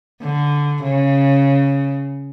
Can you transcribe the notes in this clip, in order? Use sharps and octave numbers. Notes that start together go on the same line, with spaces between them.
D3
C#3